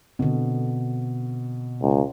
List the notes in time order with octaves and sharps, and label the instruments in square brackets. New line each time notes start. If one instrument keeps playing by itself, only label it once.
[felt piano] B2 [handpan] D3 C4
[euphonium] C#2